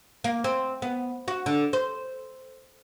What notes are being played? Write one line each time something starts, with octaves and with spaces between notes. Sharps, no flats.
A#3
C4
B3
F#4
D3
C5